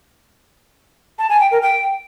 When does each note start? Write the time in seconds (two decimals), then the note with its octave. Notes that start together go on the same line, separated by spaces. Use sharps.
1.19 A5
1.30 G#5
1.40 G5
1.51 A#4
1.62 G5